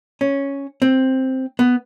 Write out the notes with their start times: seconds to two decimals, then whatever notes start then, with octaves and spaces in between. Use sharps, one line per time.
0.21 C#4
0.82 C4
1.59 B3